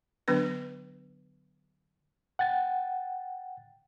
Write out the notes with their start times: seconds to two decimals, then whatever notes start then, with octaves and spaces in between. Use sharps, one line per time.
0.28 D3 F#3 B3 D4 B4
2.39 F#5 G5 A6